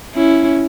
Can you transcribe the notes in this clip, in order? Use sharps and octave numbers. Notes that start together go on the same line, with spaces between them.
C#4 E4